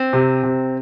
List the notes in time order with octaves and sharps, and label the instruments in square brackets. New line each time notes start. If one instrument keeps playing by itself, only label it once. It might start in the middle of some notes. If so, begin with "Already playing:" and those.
Already playing: [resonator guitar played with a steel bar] C4
[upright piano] C3
C3